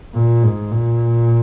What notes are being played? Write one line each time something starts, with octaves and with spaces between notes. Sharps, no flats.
A#2
G#2
A#2